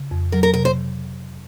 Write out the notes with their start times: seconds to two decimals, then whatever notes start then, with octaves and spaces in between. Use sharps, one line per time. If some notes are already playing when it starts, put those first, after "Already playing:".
Already playing: C#3
0.11 F2
0.32 F#3 A#4
0.43 A#4
0.54 C3 A#4
0.65 C5